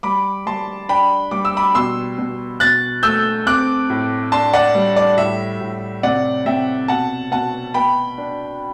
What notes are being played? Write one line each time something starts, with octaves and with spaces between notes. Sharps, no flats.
G3 B5 D6
G3 A5 C6
D4 G5 B5
G3 D6
E6
B5 D6
B2 C6 E6
B2
B2 F#6 A6
A3 E6 G6
C4 D6 F#6
A2
D4 A5 C6
D5 F#5
G3
D5
A2 E5
A2
C3 D5 F#5
C3 E5 G5
B2 F#5 A5
B2 F#5 A5
B3 G5 B5
D4